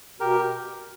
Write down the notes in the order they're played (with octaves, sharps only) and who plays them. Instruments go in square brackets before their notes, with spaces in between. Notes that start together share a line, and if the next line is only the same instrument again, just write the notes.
[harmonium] B2 [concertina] G4 A#4